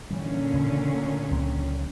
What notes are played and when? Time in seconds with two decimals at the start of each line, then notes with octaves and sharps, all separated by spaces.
0.11 A#2 D3 E3 G3 C#4
0.54 C#3 E3
0.95 A3
1.31 C#2 F#3 C4